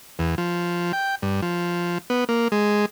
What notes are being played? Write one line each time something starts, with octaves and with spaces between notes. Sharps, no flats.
E2
F3
G5
G2
F3
B3
A#3
G#3